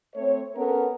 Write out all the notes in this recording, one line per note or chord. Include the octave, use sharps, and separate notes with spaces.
A3 C4 C#5
B3 C#4 A4 A#4